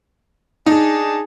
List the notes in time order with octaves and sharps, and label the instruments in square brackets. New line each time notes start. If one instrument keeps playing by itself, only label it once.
[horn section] D4 G#4 A5 [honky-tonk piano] D#4